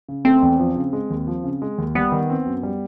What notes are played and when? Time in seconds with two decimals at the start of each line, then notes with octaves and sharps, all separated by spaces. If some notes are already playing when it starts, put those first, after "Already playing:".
0.08 C#3
0.25 A3 C4
0.42 E2
0.59 F3
0.76 C#3
0.93 G#3
1.10 D#2
1.27 F3
1.44 C#3
1.62 G#3
1.78 D#2
1.95 G3 B3
2.12 D#3
2.30 C4
2.46 F#2
2.63 G3